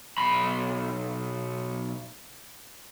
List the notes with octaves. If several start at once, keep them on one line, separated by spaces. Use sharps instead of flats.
B1 B5